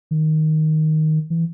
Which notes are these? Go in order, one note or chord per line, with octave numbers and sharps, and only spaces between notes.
D#3
E3